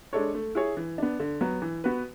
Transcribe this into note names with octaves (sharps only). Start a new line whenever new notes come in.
G#3 D4 A4 C#5
A3
E4 G#4 C#5
E3
B3 D4
D3
F#3 B3
E3
B3 F#4 B4